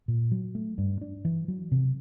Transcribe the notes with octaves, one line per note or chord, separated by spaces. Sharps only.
A#2
F#3
A3
G2
D4
E3
F#3
C3